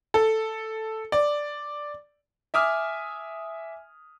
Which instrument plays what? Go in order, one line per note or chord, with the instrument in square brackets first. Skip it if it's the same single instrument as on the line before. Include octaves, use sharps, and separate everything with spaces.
[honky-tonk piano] A4
D5
[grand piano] E5 G#5 D6 D#6 F6